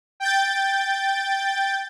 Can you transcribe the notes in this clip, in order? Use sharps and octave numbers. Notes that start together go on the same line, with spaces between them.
G5 G6 A6